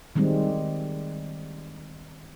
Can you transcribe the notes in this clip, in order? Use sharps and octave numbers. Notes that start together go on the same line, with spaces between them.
D#3 G3 G#3 C4